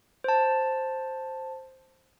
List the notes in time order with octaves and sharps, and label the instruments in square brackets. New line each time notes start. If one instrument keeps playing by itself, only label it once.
[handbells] C5 A5